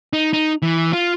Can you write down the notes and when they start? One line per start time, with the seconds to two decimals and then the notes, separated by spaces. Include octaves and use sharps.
0.13 D#4
0.33 D#4
0.62 E3
0.93 F4